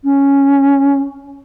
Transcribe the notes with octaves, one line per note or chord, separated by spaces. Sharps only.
C#4